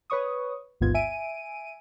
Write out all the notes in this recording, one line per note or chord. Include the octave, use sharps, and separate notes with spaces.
B4 C#5 C#6 D#6
A1 D#2 G#2 B3 F4 G#6
E5 G#5 D7 D#7